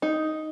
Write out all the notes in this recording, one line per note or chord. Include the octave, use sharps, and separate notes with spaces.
D#4